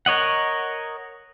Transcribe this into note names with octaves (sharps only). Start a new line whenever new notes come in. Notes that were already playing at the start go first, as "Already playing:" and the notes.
A#4 C#5 D#5 F#5